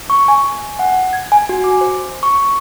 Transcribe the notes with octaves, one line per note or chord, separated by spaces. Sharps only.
C#6
G#5
F#5
G#6
G#5
F#4
D6
C5
C#6